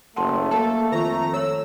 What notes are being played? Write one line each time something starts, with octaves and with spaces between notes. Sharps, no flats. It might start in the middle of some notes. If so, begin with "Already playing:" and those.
F#1 A3 F#5 A5 C6
A#3 A4 A5
F2 D#3 F4 A#5
A4 C#5 E6